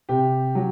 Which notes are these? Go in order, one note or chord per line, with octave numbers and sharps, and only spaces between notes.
C3 G4
F#3